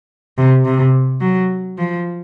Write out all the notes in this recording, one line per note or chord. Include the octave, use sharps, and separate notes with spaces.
C3
C3
F#3
F3